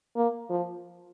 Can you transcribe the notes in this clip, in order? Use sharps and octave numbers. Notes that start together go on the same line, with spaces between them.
A#3
F3